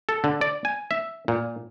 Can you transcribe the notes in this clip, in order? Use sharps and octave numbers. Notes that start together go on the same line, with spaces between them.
A4
D3
D5
G#5
E5
A#2